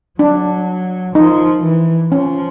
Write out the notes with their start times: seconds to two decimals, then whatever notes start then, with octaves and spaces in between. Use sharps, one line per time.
0.19 F#3 D4
1.15 F3 D#4
1.64 E3
2.12 F3 C#4